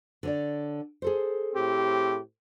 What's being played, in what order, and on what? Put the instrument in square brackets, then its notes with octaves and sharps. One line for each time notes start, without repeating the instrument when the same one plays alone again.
[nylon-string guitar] D3 C#5 D5
G#4 A4 C5
[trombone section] A2 C4 G4